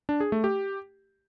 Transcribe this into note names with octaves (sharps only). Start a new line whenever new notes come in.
D4
G#4
A3
G4